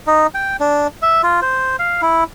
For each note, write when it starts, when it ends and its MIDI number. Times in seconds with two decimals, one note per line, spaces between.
0.07 0.27 63
0.35 0.57 79
0.60 0.87 62
1.02 1.22 76
1.23 1.40 65
1.42 1.76 72
1.79 2.01 77
2.02 2.24 64